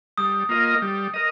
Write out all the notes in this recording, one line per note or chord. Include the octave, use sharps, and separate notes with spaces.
G3 D#6
A#3 F4 A#4 D#5
G3
A#4 D#5